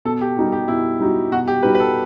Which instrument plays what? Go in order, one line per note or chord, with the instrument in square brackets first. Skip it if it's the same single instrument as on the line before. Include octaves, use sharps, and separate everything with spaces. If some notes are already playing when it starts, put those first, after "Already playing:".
[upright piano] B2 [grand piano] A4
[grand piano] G4
[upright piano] G3 D#4 F#4
[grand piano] G4
[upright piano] B2 [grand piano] E4
[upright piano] G3 D#4 F#4
[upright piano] B2 [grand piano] F#4
[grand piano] G4
[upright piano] G3 D#4 F#4 [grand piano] B4
[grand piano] B4
A4